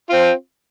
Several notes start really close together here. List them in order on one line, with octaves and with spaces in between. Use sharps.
F4 C4 C5